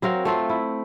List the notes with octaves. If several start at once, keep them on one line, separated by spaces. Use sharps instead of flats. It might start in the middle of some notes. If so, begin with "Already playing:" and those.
F#3 C4 A#4 F5
A3 C4 F4
E4